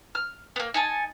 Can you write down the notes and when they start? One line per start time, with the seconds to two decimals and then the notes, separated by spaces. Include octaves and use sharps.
0.15 F6
0.56 A#3 B3
0.74 D#4 G#5 A5